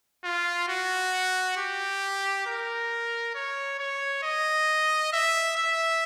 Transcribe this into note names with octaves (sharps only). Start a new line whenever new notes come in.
F4
F#4
G4
A#4
C#5
C#5
D#5
E5
E5